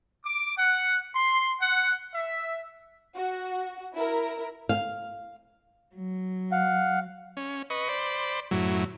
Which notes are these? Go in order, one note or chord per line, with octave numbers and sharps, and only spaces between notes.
D6
F#5
C6
F#5
E5
F#4
E4 A#4
F5
F#3
F5 F#5
C#4
B4 D#5 C#6
C5 D5 B5
F#2 A2 F#3 E4